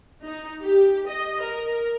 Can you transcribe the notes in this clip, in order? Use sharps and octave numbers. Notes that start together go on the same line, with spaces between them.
D#4
G4
D#5
A#4